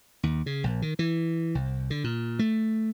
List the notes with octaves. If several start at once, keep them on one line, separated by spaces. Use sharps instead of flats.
D#2
C#3
A#1
D#3
E3
C2
D3
A#2
A3